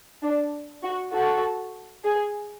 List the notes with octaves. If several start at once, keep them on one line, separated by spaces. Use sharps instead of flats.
D4
F#4
F#4 A4
G#4